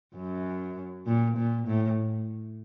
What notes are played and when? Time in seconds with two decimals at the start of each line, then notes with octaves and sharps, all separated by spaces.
0.16 F#2
1.07 A#2
1.37 A#2
1.67 A2